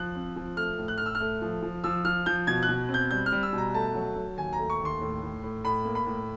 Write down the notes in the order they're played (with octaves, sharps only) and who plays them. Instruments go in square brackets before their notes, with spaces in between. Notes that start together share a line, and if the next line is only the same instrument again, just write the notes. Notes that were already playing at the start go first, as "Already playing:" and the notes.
Already playing: [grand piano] F3 F#6
C4
F3
A3 F6
A2
F#6
A2 F6
E6
F6
A3
F3
F3
F3 E6
F3 F6
F3 G6
B2 G#6
F#6
B2
C4
G6
G3 G6
F6
G3
E6
B2
A#5
A3 A5
F#3
F#3
D#2 G#5
A#5
A3
C#6
D#2
C6
A2
A2
A2
A2 B5
A#3
B5
A2